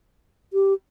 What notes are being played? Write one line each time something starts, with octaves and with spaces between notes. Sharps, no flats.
G4